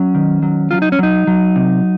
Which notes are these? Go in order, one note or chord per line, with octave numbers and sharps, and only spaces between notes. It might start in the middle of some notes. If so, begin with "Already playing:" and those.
Already playing: F#3 C#4
D#3
F#3
F#3 F4
D#4
C#4
F#3 D#4
F#3
C3